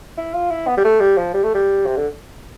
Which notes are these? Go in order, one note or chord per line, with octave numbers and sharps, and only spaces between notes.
E4
F4
E4
B3
G3
A3
G3
F3
G3
A3
G3
C3
D3